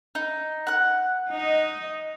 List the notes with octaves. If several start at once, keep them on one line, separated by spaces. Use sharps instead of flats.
D#4
F#5 F#6
D#4 D#5